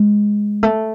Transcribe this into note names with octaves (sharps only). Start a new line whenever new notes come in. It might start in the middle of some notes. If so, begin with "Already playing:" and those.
Already playing: G#3
A3